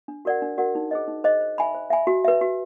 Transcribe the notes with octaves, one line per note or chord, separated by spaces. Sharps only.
D4
F#4 A#4 D5 F#5
D4
F#4 A#4 D5 F#5
D#4
G#4 C5 D#5
D#4
G#4 C5 D#5
C5
E5 G#5 B5
C5
E5 G#5 B5
F#4
B4 E5
F#4